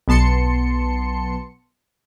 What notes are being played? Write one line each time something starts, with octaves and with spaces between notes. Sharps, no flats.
B1 B3 A5 C6 C#7